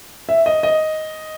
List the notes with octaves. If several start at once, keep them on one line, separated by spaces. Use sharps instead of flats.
E5
D#5
D#5